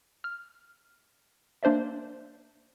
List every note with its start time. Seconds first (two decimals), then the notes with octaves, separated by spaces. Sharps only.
0.24 F6
1.63 A#3 D4 C5 D5 E5